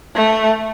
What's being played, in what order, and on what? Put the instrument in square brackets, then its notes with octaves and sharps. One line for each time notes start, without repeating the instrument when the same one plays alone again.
[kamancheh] A3